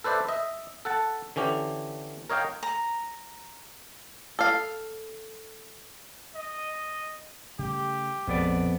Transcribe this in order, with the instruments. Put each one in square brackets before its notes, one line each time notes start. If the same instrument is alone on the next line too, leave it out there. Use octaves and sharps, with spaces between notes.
[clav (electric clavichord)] A4 B4 C5 D5 E5
D#5 E5
A4 F#5 A5
D3 E3 C#4 G4
A#4 C#5 D#5 F5 G5
[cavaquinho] A#5
[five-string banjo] A4 F5
[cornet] D#5
[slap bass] C#3 G3 A3 [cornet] G4
[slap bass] A#1 G#3 [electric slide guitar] F2 B3 D5